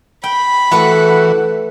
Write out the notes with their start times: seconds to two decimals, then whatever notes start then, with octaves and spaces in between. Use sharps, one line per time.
0.24 G5 B5
0.71 E3 A3 F#4 B4 F#5